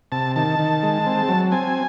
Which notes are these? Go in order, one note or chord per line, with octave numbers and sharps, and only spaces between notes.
C3 A5
D#3 A5
D#3
G#3
C4
F#3
C4 G#5